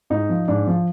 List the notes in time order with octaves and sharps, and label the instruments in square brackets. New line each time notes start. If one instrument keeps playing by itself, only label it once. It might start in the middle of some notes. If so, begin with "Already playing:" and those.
[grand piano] G#2 D#4
F3
G#2 D4
F3